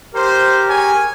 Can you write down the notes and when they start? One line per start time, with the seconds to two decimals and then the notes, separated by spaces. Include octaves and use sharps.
0.14 G4 A#4 C5
0.68 G#4 C#5 G#5